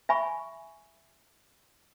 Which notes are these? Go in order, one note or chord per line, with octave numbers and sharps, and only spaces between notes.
E5 G#5 B5 C#6